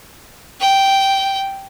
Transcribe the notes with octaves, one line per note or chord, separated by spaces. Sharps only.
G5